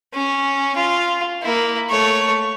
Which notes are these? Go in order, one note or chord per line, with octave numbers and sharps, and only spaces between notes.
C#4
F4
A#3 E4
A3 C#5